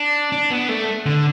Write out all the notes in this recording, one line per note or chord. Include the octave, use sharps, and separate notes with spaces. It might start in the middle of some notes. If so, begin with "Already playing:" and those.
Already playing: D4
D4
B3
A3
D3